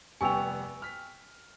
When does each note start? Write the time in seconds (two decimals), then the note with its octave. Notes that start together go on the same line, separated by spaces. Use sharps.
0.21 F1 G3 B3 G5 G#5 C#6 E6 F7
0.82 F6 B6